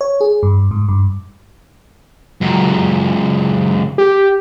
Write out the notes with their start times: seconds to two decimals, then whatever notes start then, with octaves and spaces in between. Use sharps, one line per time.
0.01 C#5
0.21 G#4
0.43 G2
0.71 G#2
0.89 G2
2.42 C#2 F#2
3.98 G4